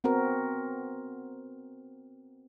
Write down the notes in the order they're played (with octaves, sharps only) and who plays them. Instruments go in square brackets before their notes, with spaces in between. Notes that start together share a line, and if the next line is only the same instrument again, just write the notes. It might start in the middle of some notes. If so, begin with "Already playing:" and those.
[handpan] B3 C4 F#4 A#4 B4